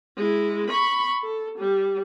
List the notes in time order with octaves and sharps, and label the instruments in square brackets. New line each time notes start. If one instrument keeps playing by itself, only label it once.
[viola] G#3 E4
B5 C#6
A4
G3